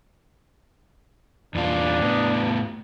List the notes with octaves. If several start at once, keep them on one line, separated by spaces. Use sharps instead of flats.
E2 A#2 D4 F4
A2 B3